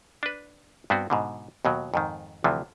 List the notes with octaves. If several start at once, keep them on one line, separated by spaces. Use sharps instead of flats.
D4 B4
G2 B3 C4 F#4
G#2 B2 D3
D#2 B2 F#3
F2 G#2 D#3
D2 C3 E3 F3